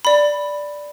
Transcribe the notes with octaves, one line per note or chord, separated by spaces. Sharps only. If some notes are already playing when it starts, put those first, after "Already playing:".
D5 B5